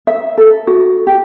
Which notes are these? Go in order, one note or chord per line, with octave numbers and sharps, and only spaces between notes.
E5
A4
F#4
G4